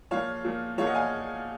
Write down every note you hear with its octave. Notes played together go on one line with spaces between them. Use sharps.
A#2 F3 C#5 F5
A#2 F3
A#2 F3 C#5 F5
D#5 F#5
F5 G#5